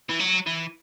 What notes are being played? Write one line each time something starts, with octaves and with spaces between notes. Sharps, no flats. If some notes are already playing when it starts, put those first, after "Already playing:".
E3
F#3
E3